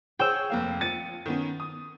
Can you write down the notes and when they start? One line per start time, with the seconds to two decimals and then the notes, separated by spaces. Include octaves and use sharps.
0.19 G#4 C5 C#5 G5 E6
0.50 F1 A#3 F5
0.81 F3 A6 C#7 D#7
1.26 D#3 B3 C#4
1.60 D#6